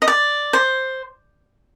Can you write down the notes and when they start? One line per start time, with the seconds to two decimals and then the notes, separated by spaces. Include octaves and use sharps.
0.02 D#5
0.08 D5
0.53 C5